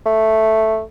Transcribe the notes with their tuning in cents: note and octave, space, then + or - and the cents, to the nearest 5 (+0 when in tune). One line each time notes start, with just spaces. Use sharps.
A3 +0